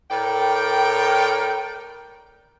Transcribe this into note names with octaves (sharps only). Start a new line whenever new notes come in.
A2 A#4 D5 G5